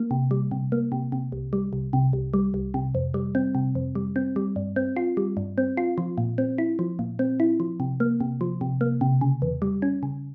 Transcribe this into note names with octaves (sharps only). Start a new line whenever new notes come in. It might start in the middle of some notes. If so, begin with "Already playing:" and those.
Already playing: A#3
C3
G3
C3
A#3
C3
C3
C2
G3
C2
C3
C2
G3
C2
C3
F2
G3
C4
C3
F2
G3
C4
G3
G2
C4
F4
G3
G2
C4
F4
F3
A#2
C4
E4
F3
A#2
C4
E4
F3
C3
A#3
C3
F3
C3
A#3
C3
C#3
E2
G3
C#4
C#3